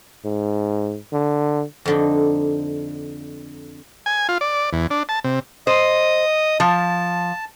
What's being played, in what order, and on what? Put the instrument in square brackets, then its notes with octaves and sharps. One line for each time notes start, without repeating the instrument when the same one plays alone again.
[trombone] G#2
D3
[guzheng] F2 D3 D#4
[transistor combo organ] G#5
F4
D5
E2
D4
A5
C3
[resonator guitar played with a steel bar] C5 [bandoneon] D#5 D#6
[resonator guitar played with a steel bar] F3 [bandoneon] A5